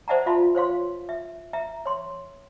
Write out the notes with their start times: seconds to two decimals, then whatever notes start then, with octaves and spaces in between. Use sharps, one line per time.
0.08 C5 D5 E5 F#5 A5 A#5
0.26 F4 E5 F5 A5 B5 C6
0.55 C5 C#5 F5 C6
1.09 E5
1.53 E5 A#5
1.86 C#5 C6